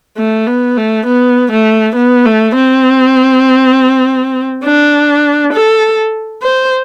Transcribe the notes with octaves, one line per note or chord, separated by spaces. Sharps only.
A3
B3
A3
B3
A3
B3
A3
C4
D4
A4
C5